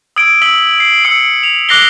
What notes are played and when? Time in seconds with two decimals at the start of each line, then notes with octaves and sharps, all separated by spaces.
0.16 D#6 E6 G#6 D7
0.42 E6 B6 F#7
0.80 C7
1.04 E6 C#7 D7
1.43 F7
1.69 D6 F#6 A#6 C7 G7